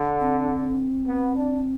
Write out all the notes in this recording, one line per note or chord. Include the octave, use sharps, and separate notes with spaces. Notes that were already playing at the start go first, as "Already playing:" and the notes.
Already playing: D3
C4
B3
D4